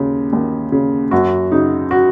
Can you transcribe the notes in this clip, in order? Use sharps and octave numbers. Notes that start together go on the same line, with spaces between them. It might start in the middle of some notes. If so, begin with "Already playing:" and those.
Already playing: D#2 C#3
D#2
C#3
F#2 F#4
C#3 D#4
F#4